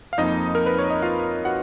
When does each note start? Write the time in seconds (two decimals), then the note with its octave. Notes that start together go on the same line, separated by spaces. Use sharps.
0.13 F5
0.18 F2 F3 A#3 D#4 D#5
0.55 A#4
0.66 B4
0.79 C#5
0.91 D#5
1.02 F4 F5
1.45 F#4 F#5